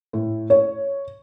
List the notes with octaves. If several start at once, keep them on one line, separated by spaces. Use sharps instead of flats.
A2
C#5